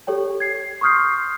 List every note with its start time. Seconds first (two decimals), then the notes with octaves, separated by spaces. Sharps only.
0.07 G4 A4 C#5 G5
0.40 G#6 C7
0.81 C6 C#6 D#6 F6 G6 C7